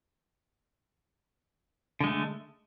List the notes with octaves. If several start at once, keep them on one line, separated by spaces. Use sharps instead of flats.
D3 G#3 A3